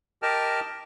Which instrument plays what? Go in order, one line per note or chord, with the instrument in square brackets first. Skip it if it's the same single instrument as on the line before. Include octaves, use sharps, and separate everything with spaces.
[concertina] G4 A#4 D#5 G5 A5 F6